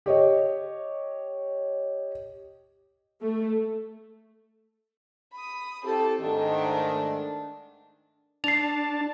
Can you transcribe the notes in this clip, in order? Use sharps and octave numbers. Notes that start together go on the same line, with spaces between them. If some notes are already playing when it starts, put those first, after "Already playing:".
G4 C#5 D#5
A3
B5 D#6
C4 E4 G4 A4 A5
G#2 D#3 A3 D4
D4 A5 C7 F7